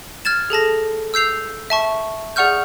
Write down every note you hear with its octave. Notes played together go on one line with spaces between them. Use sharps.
F6 G#6 A6 E7
G#4 A4 A5 A#6
E6 G6 C7 F7
E5 A5 C#6
G#4 D5 F#5 C#6 F6 G6